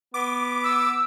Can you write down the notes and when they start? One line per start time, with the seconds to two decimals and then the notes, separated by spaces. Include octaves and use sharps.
0.14 B3 D6
0.63 E6